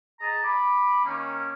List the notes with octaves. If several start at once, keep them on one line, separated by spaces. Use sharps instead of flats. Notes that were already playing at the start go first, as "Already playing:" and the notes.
G#4 D#5 A5 A#5
B5 D6
D#3 A#3 C#4